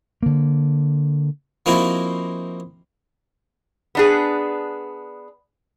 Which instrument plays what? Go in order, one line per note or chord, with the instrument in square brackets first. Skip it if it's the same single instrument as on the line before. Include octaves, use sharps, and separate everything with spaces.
[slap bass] D3 A#3
[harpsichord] F3 A#3 C4 D#4 E4 F#4
[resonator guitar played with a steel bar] B3 D4 G#4